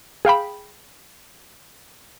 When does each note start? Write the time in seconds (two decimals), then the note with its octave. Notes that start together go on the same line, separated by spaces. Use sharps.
0.25 G#4 F5 G5 B5